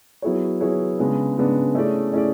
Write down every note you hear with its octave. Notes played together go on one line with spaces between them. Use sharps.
F#3 B3 E4 G#4 C#5
F#3 B3 E4 G#4 C#5
C#3 G#3 B3 D4
C#3 G#3 B3 D4
A3 C#4 E4 G#4 D5
A3 C#4 E4 G#4 D5